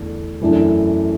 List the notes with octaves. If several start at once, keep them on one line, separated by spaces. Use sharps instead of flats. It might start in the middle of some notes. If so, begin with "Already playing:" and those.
Already playing: E2 D3 A3 D4
F#2 E3 A3 D4